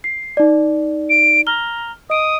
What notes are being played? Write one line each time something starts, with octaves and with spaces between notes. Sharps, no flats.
C7
D#4 D5
D7
A#5 F6 G7
D#5 D#6 D7